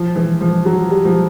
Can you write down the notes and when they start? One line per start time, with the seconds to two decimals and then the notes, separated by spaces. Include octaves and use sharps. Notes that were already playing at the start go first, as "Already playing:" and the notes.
Already playing: F3
0.16 E3
0.41 F3
0.66 F#3
0.90 G3
1.05 F3